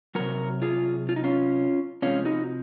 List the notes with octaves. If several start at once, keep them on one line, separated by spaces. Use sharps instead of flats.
C3 F#3 F#4 A#4
F4 G#4
F4
D#4
C#4 F4
C3 F3 G#3 C#4 F4
D#4 F#4